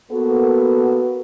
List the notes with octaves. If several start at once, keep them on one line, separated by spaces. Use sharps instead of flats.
A#3 B3 F#4 A4